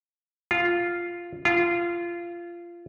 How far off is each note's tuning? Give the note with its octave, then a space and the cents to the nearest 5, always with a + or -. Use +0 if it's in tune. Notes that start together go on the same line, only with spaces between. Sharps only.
F4 -5
F4 -20